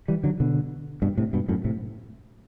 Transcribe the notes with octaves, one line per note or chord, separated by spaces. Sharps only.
E3 G3
D3 F#3
B2 D3
G2 B2
A2 C3
G2 B2
F#2 A2
A2 C3